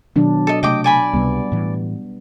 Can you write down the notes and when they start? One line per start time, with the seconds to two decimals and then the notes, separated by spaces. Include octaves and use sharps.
0.16 B2 D#3 F#3 D4
0.47 A4 D#5
0.63 C3 A3 D#5 G5 D6
0.84 D5 G#5 B5
1.13 C#2 C3 G3 B3
1.52 A2 E3